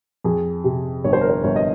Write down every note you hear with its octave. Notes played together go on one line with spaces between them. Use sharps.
F2 G#4
C3
G1 C#5
C5
A#4
C5
G1 C#5
D#5